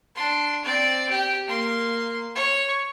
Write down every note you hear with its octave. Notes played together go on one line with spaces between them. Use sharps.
D4 C6
C4 D5
G4
A#3 C6
C#5